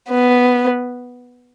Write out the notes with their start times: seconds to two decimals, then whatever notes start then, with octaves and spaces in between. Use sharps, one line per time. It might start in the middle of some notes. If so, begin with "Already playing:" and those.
0.10 B3